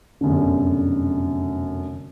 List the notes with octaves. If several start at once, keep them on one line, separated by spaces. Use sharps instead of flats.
F1 F#2 B2 D3